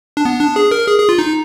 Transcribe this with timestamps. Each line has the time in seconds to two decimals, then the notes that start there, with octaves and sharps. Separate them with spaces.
0.17 D4
0.25 B3
0.40 D4
0.56 G#4
0.71 A#4
0.88 G#4
0.98 G#4
1.09 F4
1.19 D#4